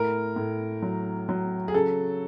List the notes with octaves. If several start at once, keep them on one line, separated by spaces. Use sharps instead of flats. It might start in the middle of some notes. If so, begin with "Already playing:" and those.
Already playing: A2 A#4
A2
F#3
F#3
G#4
C#3 A4